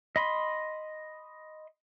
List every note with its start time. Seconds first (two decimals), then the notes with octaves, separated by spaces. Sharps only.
0.16 D#5 B5 C6